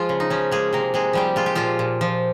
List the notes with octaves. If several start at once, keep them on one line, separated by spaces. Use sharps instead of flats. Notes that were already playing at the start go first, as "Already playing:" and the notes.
Already playing: F3 G#3 F4
C#3
D#4
F3 C#4
G#3 A#3 G#4
C3 A#3 A#4
C3 G#3 G#4
F3 G3 G4
G#3 F4
G4
A#2 F3 F4
A#2
F3